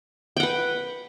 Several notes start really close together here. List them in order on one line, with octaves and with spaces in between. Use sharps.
G5 F#5 B4